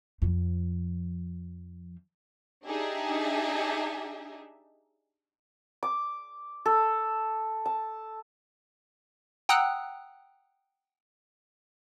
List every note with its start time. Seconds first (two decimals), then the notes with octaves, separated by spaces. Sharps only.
0.22 F2 F3
2.66 D4 D#4 G4 G#4 E5
5.83 D6
6.66 A4
7.66 A5
9.49 F#5 G5 A#5 D#6 E6 F#6